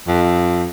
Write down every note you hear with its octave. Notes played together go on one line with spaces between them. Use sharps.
F2